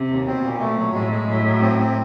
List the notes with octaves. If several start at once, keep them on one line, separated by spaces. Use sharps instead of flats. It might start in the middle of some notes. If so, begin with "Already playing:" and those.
Already playing: C3
D#2
B2 C4
A#2
A3
F#3
A2 G#3
G#3
A2 F#3
F#3
C4
C4